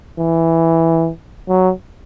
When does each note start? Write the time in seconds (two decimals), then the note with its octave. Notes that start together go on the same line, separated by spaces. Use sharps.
0.20 E3
1.49 F#3